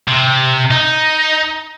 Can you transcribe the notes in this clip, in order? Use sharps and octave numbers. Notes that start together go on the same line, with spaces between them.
C3
D#4